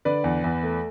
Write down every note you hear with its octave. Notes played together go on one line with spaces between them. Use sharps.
D3 B4 D5
E2
E2
A3